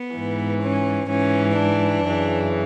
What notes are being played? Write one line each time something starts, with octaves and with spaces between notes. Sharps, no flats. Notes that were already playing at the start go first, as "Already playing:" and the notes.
Already playing: B3
G#2 E3
C#4
G#2 E3 C#4
D4
F#2 C#3 E3